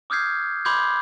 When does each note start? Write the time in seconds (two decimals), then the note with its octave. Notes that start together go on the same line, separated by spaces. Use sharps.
0.10 D6 D#6 F6 G6 G#6 C7
0.65 B5 C6 D6 G6 G#6